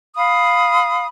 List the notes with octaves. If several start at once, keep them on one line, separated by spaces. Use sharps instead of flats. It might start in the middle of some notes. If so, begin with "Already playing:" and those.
F5 B5 D#6